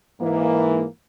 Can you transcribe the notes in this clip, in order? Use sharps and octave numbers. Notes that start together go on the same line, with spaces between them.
G#2 E3 A#3